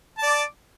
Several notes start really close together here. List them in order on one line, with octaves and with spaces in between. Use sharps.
A5 D5 D6